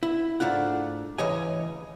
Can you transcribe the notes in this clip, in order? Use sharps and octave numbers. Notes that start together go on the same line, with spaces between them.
E4
G#2 A3 D4 F4 F#5
C#2 E3 C#5 D#5 G#5